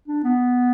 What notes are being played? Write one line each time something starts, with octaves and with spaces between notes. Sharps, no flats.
D4
B3